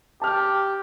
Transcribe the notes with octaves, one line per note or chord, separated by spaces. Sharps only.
G4 A5 F6